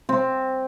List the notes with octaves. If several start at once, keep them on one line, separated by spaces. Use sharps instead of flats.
C4